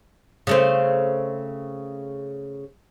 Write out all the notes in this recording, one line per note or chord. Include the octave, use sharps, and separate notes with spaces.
C#3 A3 C4